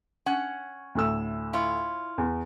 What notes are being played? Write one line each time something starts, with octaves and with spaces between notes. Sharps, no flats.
C#4 F#5
D2 A2 E6
E4 F4 C#5
E2